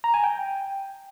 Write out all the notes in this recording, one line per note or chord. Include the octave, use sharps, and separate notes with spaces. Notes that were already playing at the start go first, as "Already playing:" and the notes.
A#5
G#5
G5